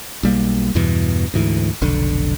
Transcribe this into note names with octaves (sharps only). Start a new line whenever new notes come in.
B1 G3 A#3
E2 G2 B2 E3
D2 G#2 E3
F1 B1 D3